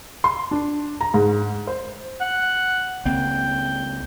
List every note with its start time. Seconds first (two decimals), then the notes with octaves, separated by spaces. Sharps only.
0.24 C6
0.51 D4
1.01 A#5
1.14 G#2
1.67 C5
2.21 F#5
3.05 C#2 A#3 C4 G5